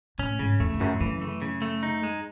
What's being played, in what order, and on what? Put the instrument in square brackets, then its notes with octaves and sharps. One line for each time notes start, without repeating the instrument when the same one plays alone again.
[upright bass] A2 [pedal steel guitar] C#4
[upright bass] G#2 [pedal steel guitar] C#3
[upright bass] E2 [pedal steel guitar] A3
[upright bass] E2
[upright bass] F#2 [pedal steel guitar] C#3
[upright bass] F#2 [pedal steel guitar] E3
[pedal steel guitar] A3
C#3
A3
D#4
G#3